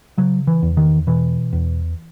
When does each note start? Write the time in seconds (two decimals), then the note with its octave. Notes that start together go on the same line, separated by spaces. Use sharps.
0.18 C#3 F#3
0.47 E3
0.62 E2
0.77 D#3
1.07 B2 E3
1.53 E2